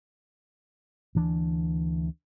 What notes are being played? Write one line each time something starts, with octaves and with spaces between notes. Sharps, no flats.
D2 E3 D4